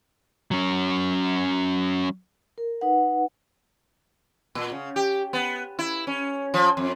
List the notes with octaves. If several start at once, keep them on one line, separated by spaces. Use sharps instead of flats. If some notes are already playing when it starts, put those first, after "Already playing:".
F#3 C#4
A#4
D#4 B4 F#5
A#2
C#3
G4
B3
E4
C#4
F3
F2